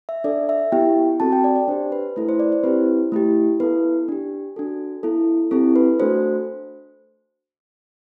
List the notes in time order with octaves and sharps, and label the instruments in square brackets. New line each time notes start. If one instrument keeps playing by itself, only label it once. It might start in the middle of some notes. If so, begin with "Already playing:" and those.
[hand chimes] E5
D4 A4 D5
E5
B3 E4 G4 G5
C4 F#4 A4 A5
G5
D5
D5
D4 G4 C5
B4
A3 E4 A4 B4
C5
D5
C5
C4 E4 G4 B4
A3 E4 G4
B3 E4 A4 B4
D4 G4
D4 F#4 A4
B3 E4 A4
C4 E4 G4 A4
B4
A3 D4 F#4 A4 C5